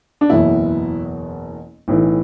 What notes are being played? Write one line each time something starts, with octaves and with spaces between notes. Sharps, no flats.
D4
F#1 E2 B2 E4
B1 A2 E3